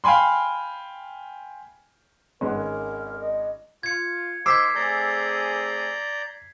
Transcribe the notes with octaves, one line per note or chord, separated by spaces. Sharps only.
F5 G5 G#5 B5 C6
G#1 G#3 C#4 B4
A#4
D#5
F4 G#6 C#7
D#3 C5 D6 E6 G#6 B6 C7
A3 C4 G#4 D5 A#5 G6